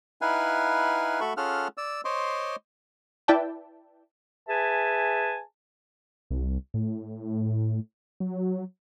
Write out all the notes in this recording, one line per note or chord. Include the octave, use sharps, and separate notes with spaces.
D#4 E4 B4 F5 F#5 G#5
A3 F#4 A4 B5 C#6
C#4 F4 G#4 A4 F#5 F6
D5 E6
C5 C#5 D#5 C6 D6
E4 B4 D5 E5 G5 A5
G#4 B4 E5 G#5 A5
C2
A2
F#3